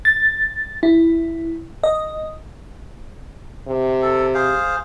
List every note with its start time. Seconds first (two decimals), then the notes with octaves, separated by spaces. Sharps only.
0.05 A6
0.83 E4
1.83 D#5
3.68 C3
4.02 A4
4.34 G#4 C5 F5